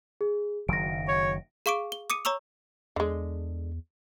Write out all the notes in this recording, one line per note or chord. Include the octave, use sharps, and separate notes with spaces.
G#4
F#1 D#3 F#3 A#6 D7
C#5
G#4 F5 C#6 D6 D7
G7
D6 D#6 C#7 D#7
C#5 A#5 C#6 E6 F7
E2 D3 G#3